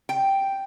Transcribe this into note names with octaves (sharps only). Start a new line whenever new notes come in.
G5